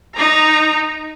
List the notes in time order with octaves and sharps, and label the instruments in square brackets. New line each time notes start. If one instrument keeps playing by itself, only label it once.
[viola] D#4 A#5